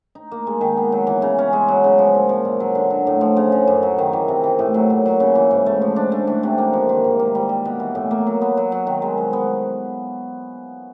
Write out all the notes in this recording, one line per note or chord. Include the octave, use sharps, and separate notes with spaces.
D#4
A#3
G#3
D#3
B3
F#3
E3
C#3
C#4
G#3
F#3
C#3
F3
A#2
F3
A#2
F#3
D3
F#3
A2
F3
C#3
C#3
F#2
F#3
D#3
E3
C3
E3
A2
F#3
A#2
F#3
C#3
E3
G#2
A3
F3
D4
A3
E3
C3
A#3
F3
D#3
G#2
A#3
G3
G3
B2
E3
A2
A#3
F#3
B3
F#3
F#3
D#3
G#3
F3
B3